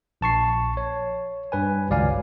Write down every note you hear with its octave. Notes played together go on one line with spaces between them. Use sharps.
A#1 A5 C#6 C7
C#5
G2 B4 G#5
G#1 C#2 F#3 D5 F5 G#5